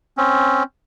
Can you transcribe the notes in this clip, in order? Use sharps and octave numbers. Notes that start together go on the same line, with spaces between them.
C4 C#4